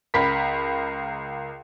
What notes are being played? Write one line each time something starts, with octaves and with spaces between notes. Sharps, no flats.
C#2 A#4 B5 B6